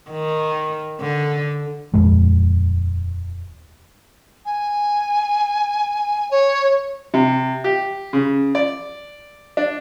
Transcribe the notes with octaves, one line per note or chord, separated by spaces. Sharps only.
D#3
D3
D#1 F2 G#3
G#5
C#5
C3
G4
C#3
D5
D4